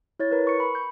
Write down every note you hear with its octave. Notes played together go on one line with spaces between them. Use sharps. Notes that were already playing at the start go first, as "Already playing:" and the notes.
E4 C#5 A6
A#4 B4
C#6 C#7
B5
G6